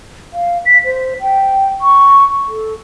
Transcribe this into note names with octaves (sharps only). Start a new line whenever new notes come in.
F5
B6
C5
G5
C#6
A4